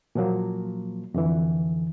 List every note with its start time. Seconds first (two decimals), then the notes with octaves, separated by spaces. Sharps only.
0.15 A#2 F3 F#3 A#3
1.14 F2 D3 E3